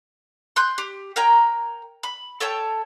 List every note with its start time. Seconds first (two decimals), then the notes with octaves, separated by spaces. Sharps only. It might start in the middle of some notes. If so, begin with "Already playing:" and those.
0.56 C6 F#6 G6
0.78 G4
1.16 A#4 C#5 G5 A#5
2.03 B5
2.40 A4 C#5 G5 A5